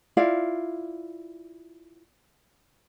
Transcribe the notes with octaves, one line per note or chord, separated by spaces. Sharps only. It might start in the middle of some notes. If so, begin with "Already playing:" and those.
E4 F4 D5 F5